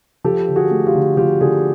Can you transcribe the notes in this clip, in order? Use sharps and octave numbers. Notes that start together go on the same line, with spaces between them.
F3 G4 A4
D3
F#4 G#4
A3
F4 G4
D3
F3 F4 G4
D3 F#4 G#4